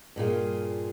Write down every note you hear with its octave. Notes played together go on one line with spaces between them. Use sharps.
G2 A#2 F4 G#4